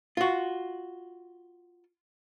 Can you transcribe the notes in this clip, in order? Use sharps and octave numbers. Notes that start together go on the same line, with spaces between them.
F4 F#4